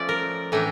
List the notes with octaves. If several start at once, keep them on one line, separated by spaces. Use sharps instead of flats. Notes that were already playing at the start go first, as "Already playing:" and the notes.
Already playing: F3 A3 C#4 D5
A#4
A2 E3 A3 D4